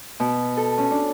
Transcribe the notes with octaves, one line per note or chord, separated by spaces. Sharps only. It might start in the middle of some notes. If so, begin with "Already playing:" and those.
B2
A4
C#4
D4